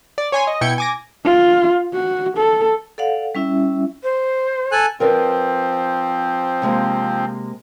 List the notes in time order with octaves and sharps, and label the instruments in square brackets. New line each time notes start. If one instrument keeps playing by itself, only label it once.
[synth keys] D5
C#5 G#5 C6
D#5
B2 E4 G5 G#6 C#7
G#5 D6 A#6
[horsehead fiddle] F4
F#4
A4
[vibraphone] A4 D5 F5 F#5
G3 C#4 E4 E5
[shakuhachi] C5
[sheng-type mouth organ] A4 G#5 F#6
[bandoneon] F3 C4 [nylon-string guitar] A#4 B4 D5
[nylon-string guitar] C3 G#3 A#3